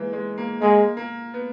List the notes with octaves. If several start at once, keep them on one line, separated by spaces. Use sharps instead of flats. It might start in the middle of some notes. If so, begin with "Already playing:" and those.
Already playing: E3 G#3 A#3
G#3
A#3
G#3 A#3
A#3
B3